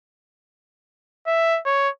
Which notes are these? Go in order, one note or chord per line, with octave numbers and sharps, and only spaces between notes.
E5
C#5